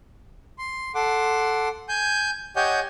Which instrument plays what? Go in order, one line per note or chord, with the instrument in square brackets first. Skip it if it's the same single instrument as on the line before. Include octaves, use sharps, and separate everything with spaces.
[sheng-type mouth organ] C6
A4 F#5 C6 D6
G#5 G6
G4 C#5 D#5 F#5 G#5 G6